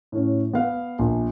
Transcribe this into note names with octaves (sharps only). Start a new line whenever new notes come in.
A2 C#4
B3 F5 F#5
A#1